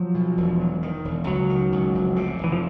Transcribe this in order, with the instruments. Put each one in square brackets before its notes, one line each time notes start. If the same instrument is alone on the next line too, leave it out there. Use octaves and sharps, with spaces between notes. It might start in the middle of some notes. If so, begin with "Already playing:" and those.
Already playing: [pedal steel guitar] F3 [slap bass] F#3
[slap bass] B2
E1
F#3
D#3
E1
[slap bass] C#2 [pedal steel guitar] F#3
[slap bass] D#3
C#2
F1
C3
F1
[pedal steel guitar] E3
F3